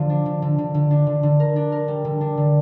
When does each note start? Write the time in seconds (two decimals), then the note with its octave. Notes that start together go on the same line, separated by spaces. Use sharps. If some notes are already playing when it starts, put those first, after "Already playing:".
Already playing: D3 F3 F4
0.10 D4
0.26 D3
0.42 D3
0.58 D3
0.74 D3
0.91 D4
1.07 D3
1.23 D3
1.40 A#4
1.56 D4
1.72 A#4
1.88 G3
2.05 D3
2.21 D4
2.37 D3